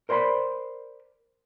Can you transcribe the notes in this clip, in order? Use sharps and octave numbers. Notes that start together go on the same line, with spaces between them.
A#4 C5 D5 G5 B5 C6